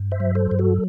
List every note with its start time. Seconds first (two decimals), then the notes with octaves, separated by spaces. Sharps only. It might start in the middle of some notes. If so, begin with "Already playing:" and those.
Already playing: G2
0.12 C5 E5
0.20 F#3
0.35 A4 C5
0.51 G2
0.59 F#4 A4